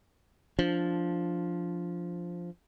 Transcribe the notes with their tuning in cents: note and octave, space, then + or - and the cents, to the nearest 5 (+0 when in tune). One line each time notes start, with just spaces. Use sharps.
F3 +0 D4 +0